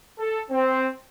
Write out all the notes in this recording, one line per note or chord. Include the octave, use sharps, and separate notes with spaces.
A4
C4